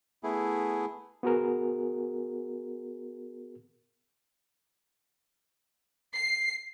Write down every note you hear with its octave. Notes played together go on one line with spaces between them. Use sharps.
A3 B3 E4 G#4
B3 F#4 G#4 A#4
C7